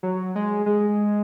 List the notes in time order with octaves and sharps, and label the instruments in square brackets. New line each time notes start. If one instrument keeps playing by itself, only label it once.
[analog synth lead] F#3
G#3
G#3